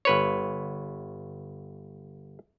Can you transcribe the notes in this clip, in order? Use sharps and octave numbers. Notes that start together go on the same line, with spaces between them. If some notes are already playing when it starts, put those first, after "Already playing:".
G1 B4 C#5